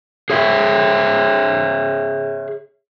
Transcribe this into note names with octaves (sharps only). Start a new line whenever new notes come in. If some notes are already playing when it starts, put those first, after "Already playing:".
G#4 C#5 E5